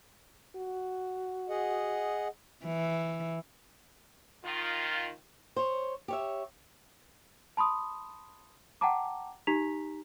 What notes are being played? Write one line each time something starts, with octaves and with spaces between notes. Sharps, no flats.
F#4
G#4 D#5 F#5
E3
D#3 F4
C5 C#5
G4 C#5 E5
A5 B5 C6 D#6
F#5 G5 A5 A#5 D6
D#4 G4 A#5 B6 F7